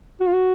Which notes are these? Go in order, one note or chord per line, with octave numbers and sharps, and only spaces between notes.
F#4
F4
F#4